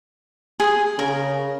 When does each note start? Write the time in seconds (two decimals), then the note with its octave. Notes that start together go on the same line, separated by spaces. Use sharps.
0.60 G#4 B5 D#6
0.99 C#3 A#4